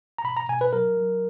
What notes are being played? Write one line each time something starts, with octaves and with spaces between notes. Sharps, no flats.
A#5
B2 B5
A#5
B2 G#5
B4
F#3 A#4
F#3